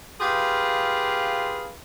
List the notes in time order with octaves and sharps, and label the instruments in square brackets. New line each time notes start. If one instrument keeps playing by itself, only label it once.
[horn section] F4 G4 G#4 B4 F5